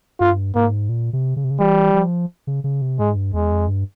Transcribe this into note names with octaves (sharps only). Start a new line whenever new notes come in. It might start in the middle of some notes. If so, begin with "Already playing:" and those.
G2 F4
G#2 A#3
A#2
C3
C#3
C3
C#3
E3 G3
F3
C#3
C#3
C3
G#2 G#3
G2
E2 G#3
F2
G2